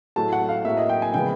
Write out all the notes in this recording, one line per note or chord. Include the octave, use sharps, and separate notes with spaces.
A2 F#3 A3 A5
F#5
F5
A2 F#3 A#3 E5
D#5
G5
G#5
C#3 F3 G#3 B3 G5